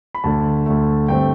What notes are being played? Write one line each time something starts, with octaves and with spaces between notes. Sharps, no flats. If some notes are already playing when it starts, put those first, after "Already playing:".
B5
D2 D3 A3 A5
D2 D3 A3
G2 D3 A3 C4 G5